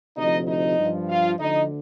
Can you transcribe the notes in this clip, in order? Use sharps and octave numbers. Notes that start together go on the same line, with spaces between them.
D2 C3 F3 D#4 D#5
D#4 D#5
G2 F3
F4 F5
D2 D3 F3 D#4 D#5